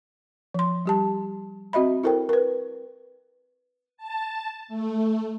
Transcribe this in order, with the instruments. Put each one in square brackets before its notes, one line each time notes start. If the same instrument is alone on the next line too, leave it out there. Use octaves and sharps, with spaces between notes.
[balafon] F3 C6
G3 G4 A5
C4 F#4 D#5 E5 B5
E4 A4 A#4 C5 G5
A#4 B4
[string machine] A5
A3